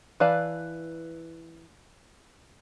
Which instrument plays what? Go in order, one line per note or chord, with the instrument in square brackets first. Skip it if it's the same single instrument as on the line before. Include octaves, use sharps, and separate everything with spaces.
[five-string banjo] E3 B4 D5 F5 A5